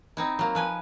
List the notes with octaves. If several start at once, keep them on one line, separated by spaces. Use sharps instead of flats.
C4 D#4 E4
F#3 A#3
F3 B4 G#5